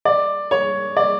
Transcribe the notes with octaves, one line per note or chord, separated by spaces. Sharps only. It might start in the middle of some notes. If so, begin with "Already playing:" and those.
D5
C#5
D5